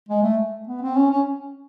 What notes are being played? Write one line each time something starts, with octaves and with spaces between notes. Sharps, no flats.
G#3
A3
B3
C4
C#4
C#4